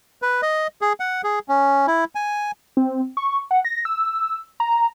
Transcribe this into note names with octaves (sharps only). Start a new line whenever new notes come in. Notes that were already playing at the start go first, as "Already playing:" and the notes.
B4
D#5
G#4
F#5
G#4
C#4
E4
G#5
C4
C#6
F#5
A#6
E6
A#5